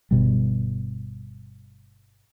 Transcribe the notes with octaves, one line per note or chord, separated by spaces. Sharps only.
G1 C2 B2 G3